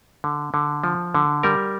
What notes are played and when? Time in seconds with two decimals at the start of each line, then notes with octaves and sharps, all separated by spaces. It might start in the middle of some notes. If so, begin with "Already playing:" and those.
0.24 D3
0.54 D3
0.84 F3
1.15 D3
1.43 G3 A#4